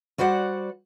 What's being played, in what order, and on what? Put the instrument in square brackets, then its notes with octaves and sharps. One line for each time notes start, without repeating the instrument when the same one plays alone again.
[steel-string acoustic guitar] G3 F#4 C5 D5 F#5